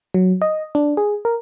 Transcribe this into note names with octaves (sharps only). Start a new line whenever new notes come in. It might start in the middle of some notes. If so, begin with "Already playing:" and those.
F#3
D#5
D4
G#4
A#4